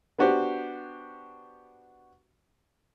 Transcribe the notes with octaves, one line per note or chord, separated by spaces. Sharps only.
B3 D4 F#4 G4 C5